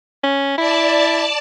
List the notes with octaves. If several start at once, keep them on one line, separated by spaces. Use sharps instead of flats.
C#4
E4 D5 A5